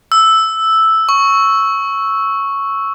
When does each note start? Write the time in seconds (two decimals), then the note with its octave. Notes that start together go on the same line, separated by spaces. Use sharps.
0.12 E6
1.09 C#6